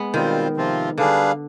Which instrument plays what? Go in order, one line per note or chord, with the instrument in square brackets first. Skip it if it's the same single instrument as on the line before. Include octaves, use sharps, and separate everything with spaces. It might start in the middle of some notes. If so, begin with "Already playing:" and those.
Already playing: [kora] G#3 B3
[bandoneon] B2 G3 C4 F4 C5 [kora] D#3
[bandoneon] C3 F3 C4 F4
[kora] D3 [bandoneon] G3 D4 G#4 B4 F5